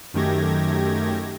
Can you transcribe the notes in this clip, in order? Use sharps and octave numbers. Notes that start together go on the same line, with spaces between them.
F#2 D#3 A3 G4 G#6 A#6